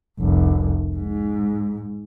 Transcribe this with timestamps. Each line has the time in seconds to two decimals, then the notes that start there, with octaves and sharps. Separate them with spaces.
0.20 F1 C2
0.96 G#2